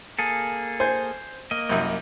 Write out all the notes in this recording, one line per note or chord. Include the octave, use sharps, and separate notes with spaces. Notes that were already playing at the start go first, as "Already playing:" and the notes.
A#3 G#4 A4
C5 G#5
A#3 D#5
C2 F#2